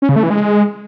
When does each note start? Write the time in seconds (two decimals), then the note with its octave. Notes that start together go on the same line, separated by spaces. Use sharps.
0.02 C#4
0.09 C#3
0.16 A3
0.23 E3
0.30 G#3